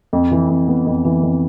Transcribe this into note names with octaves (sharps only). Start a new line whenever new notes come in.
F2
E3
F2
B3
F2
E3
F2